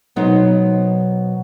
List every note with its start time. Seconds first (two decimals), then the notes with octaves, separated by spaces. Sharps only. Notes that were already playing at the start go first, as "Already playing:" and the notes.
0.16 B2 F#3 B3 D#4 C5